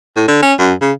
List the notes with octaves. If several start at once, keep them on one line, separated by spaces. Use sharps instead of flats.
A2
D3
C#4
F#2
C#3